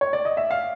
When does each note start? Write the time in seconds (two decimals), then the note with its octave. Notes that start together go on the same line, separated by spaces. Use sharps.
0.01 C#5
0.13 D5
0.25 D#5
0.37 E5
0.51 F5